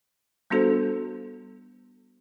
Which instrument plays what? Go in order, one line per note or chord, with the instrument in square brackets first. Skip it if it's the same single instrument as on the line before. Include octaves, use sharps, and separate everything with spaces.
[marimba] G3 B3 D4 F#4 A4 C5